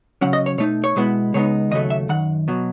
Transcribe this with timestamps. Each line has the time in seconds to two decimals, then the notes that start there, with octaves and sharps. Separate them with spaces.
0.21 C#3 F#3 C#4 F#5
0.33 D#5
0.46 C#5
0.58 B2 A3 D#4 C#5
0.84 C#5
0.96 B2 G#3 B3 E4
1.34 C#2 C#3 G#3 B3 D#4 C#5
1.71 D#2 C#3 F#3 A3 D#5
1.90 E5
2.09 F#2 D#3 F#5
2.48 B2 F#3